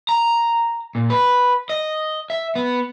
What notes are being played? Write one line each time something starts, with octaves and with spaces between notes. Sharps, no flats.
A#5
A#2
B4
D#5
E5
B3